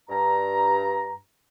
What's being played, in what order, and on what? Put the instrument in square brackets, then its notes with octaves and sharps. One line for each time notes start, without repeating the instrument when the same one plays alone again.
[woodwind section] G2 A#5